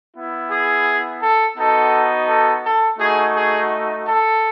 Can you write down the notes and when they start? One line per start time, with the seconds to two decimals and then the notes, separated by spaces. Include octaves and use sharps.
0.16 B3 E4
0.51 G#4
1.21 A4
1.57 B3 D#4 F#4 A4
2.28 A4
2.64 A4
2.99 A3 D#4 F#4 G#4
3.35 G#4
4.05 A4